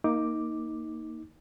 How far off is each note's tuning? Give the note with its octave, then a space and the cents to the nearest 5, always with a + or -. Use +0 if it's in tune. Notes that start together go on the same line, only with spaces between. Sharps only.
A#3 +0 D#4 +15 D6 +0